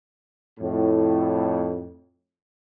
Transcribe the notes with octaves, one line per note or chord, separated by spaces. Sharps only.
F2 A2